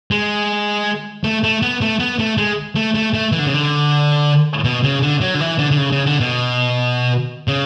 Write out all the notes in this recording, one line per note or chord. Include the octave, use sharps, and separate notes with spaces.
G#3
A3
A3
B3
A3
B3
A3
G#3
A3
A3
A3
E3
D3
C#3
D3
B2
C#3
D3
F#3
D3
E3
D3
D3
C#3
C#3
D3
B2
C#3